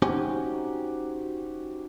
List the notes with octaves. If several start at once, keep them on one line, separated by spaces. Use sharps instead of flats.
C#4 D#4 F#4 G4 C5 G#5